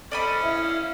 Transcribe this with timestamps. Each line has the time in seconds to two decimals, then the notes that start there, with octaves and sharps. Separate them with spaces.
0.11 C#4 A4 C5 D5 D#5 B5
0.43 E4 E5 F5